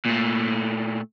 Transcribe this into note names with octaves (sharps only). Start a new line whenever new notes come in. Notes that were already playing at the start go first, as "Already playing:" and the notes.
A#2 A3